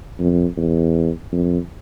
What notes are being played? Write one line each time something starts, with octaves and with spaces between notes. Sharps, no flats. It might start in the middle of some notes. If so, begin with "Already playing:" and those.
F2
E2
F2